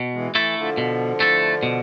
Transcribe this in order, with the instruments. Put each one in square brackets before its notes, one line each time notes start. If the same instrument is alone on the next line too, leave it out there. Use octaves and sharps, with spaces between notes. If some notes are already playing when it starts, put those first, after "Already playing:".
Already playing: [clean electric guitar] B2
[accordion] E3 G#3
[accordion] E3 [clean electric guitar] A3 E4 A4
[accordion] D3 F3
[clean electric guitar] B2
A3 E4 A4
B2